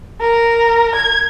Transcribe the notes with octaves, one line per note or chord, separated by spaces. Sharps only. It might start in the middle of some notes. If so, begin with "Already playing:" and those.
A#4
G#6